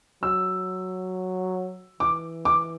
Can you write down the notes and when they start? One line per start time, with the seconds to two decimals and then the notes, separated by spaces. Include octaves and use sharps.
0.23 F#3 E6
2.00 E3 D6
2.45 D6